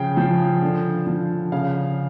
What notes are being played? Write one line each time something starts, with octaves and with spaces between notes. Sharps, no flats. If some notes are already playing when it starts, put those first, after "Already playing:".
Already playing: C#3 F3 G5
F3
D3
F3
C#3 F5